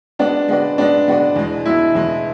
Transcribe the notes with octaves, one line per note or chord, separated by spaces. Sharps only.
G#3 B3 D4 F#4 B4 D5
G#3 B3 F#4 B4 D5
G#3 B3 D4 F#4 B4 D5
G#3 B3 F#4 B4 D5
E2 B2 G#3
E2 B2 G#3 E4
E2 B2 G#3